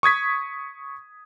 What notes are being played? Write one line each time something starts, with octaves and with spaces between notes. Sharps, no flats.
C#6 D#6 G#6 B6